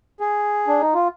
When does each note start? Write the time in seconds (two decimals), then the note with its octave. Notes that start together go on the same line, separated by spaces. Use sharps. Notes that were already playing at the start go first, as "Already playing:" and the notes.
0.20 G#4
0.68 D4
0.80 D#4
0.94 F4